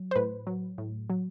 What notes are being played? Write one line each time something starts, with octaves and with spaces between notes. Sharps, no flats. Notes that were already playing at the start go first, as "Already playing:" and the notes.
Already playing: F#3
C5
A2 B4
F#3
A2
F#3